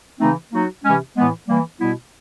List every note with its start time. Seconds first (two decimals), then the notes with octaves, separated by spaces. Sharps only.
0.19 C#3 E3 A3 C4 D#4
0.52 F#3 A#3 D#4 F#4
0.83 C3 E3 G#3 C#4
1.16 A2 E3 G#3 B3
1.48 E3 G3 A#3
1.80 B2 G3 B3 E4